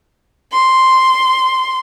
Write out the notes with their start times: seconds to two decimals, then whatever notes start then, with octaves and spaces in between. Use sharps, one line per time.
0.52 C6